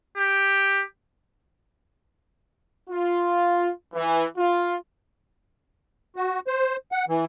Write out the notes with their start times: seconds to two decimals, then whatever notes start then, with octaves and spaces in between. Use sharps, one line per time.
0.17 G4
2.89 F4
3.95 E3
4.38 F4
6.16 F#4
6.47 C5
6.92 F#5
7.08 E3